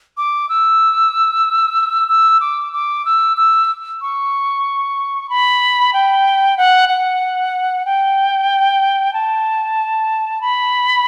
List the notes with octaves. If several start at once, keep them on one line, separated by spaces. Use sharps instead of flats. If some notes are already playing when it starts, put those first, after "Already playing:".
D6
E6
E6
D6
D6
E6
E6
C#6
B5
G5
F#5
F#5
G5
A5
B5